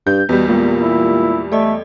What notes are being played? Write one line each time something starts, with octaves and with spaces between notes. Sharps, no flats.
G2 G6
E2 B2 G3
A#2 G#3 B3 F4
E4
A3 A4 D5 D#5